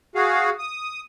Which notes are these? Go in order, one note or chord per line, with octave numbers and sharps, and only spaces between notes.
F#4 G#4 F5
D#6